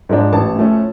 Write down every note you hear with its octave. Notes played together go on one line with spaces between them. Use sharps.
G#2 F3 G#3 D4
A1 A5
A2 F3 A3 C#4